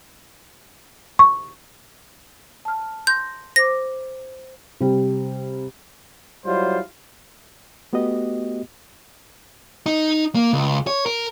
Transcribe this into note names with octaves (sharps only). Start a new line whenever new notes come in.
C#6
A5 F6
C6 G6 A#6
C5 D6 A#6
C3 G3
F#3 G3 E4 F4 C5
A3 B3 F#4 G4 D#5
D#4
A#3
C#2
C#5
A#4